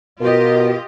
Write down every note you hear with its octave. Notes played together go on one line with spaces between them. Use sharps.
B2 F4 G4 A#4 D#5